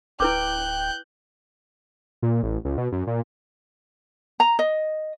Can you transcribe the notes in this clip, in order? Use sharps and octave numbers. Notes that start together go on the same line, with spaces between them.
D1 E4 B4 G5 D6 F#6 G6
A#2
A1
C#2
B2
F#2
A#2
A#5
D#5